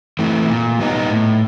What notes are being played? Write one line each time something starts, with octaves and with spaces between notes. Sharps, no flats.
E3 A3 C4
A#2
G3 B3 D#4
A2